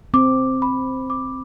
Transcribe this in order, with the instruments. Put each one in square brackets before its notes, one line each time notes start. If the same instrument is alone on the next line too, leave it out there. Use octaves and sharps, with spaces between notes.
[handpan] C4 [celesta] D6
[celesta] B5
D6